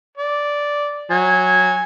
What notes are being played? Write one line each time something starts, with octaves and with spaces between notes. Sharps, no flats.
D5
F#3 G#5